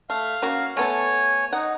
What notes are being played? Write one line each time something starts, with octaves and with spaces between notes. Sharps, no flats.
A3 F5
A#3 C#4 F#4
A3 B3 A4 C#5 G#5
D#4 F#5